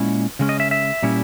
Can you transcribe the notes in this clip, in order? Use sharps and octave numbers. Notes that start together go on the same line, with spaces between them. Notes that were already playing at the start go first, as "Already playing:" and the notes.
Already playing: A#2 G#3 C#4 E4
C#3 G#3 C#4
D#5
E5
E5
A#2 G3 C#4 E4